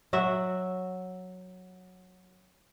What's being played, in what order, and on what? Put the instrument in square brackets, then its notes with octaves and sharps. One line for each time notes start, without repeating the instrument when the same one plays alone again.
[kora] F#3 F#4 E5